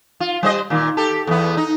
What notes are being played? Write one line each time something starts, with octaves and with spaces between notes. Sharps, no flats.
F4
G3 C5 D#5
A#2 D#3
G4 A4
E2 B3
D#4